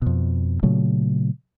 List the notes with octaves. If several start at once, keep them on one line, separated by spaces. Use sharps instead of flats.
F2 B2
A#2 C#3 F#3 A3